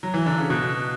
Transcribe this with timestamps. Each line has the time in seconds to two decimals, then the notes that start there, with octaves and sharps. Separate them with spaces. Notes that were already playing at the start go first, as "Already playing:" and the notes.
0.03 F#3
0.14 E3
0.26 D3
0.38 C#3
0.50 B2 F#4